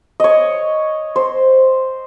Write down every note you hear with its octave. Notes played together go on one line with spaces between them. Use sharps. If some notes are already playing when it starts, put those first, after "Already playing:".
C#5 D#5
C5